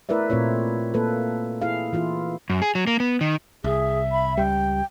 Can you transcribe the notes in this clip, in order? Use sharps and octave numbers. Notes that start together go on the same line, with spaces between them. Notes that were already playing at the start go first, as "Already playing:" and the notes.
A3 E4 A#4 B4 D5 E5
A#2 A3 C4 F4 C#5
A#3 A4 B4
E4 G#4 F5
E3 E4 F4
F#2
G#4
F#3
A#3
B3
D#3
C2 G#4 E5
B5
C#2 G3 G5